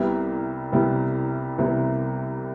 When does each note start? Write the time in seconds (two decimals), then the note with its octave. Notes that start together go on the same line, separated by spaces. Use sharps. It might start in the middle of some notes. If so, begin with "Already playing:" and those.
Already playing: C2 C3 G3 B3 E4
0.72 C2 C3 G3 B3 E4
1.58 C2 C3 G3 B3 E4